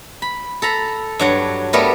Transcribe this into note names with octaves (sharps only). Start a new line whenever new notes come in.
B5
A4 A#5 B5
G2 F#3 F#5
G3 A3 B3 A#4